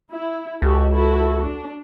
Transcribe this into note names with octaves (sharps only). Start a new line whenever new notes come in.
E4
C#2 F#4 G4 A4
E4 F#4 A4
D4